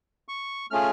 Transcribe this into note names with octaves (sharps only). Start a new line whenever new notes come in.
C#6
A3 C#4 F4 G#4 F6